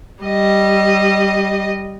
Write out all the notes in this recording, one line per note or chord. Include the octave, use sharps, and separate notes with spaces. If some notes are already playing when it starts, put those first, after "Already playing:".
G3 D#5